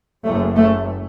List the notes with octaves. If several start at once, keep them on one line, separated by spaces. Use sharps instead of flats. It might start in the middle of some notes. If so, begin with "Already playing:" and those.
F#1 F#2 A3
A3